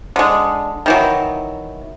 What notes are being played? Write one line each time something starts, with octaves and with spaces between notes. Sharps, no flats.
D3 G#3
D#3 E3 F#3